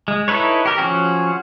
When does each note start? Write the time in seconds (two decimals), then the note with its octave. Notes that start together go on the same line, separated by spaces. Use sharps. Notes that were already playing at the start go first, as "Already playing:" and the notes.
0.08 G#3
0.28 D#4 E4 A4 B4 C#5
0.66 G4 A#4
0.78 F3 C#4 F#4 G#4